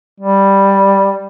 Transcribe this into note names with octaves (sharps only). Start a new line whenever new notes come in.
G3